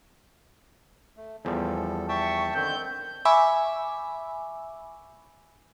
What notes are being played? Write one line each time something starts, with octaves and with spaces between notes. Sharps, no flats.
A3
E2 F3 G3 A4
E5 G5 A5 C#6
D3 D#3 C4 G6
E5 G#5 B5 C#6 D6 E6